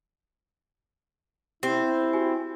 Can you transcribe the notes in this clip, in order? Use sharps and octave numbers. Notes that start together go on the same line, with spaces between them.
C4 E4 G4
F#4 G4 G#5